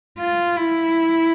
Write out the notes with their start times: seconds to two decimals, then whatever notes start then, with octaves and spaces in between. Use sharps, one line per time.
0.18 F4
0.56 E4